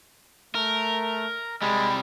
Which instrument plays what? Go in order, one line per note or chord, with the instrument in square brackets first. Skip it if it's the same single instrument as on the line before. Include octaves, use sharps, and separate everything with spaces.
[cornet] A3 [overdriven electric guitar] A#4
[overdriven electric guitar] C3 G3 [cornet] G#3 [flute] B5